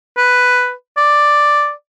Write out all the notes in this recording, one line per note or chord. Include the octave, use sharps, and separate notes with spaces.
B4
D5